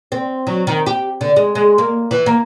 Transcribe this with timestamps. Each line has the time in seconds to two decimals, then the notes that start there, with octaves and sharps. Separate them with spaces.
0.12 C4
0.47 F#3
0.67 D#3
0.86 G4
1.21 D3
1.36 G#3
1.55 G#3
1.78 A#3
2.11 E3
2.26 A#3